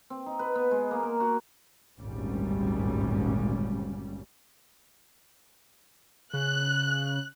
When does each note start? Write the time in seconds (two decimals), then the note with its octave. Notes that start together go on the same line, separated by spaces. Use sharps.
0.10 C4
0.26 D#4
0.39 B4
0.55 B3
0.71 G#3
0.91 A#3
1.03 A#4
1.20 F#4
1.99 G#1 D2 G2 A#2 G3 C#4
6.34 C#3 F#6